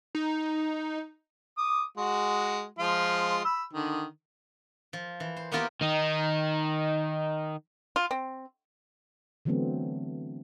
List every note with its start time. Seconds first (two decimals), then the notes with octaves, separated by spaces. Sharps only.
0.15 D#4
1.58 D6 D#6
1.97 G#3 F#4
2.79 F3 G#3 F4
3.45 B5 E6
3.73 D3 D#3
4.93 F3
5.20 E3
5.37 C5
5.52 A#3 B3 E4 F4 G4 A#4
5.81 D#3 D#4
7.96 F4
8.11 C4
9.45 D3 E3 F#3 A3 B3 C4